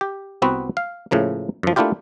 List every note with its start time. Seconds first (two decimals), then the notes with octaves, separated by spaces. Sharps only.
0.01 G4
0.42 C2 B3 C4 F#4 B4
0.77 F5
1.11 A2 C#3 F3 A#3
1.63 F#2 F3
1.76 A3 A#3 D4 E4 F4 G4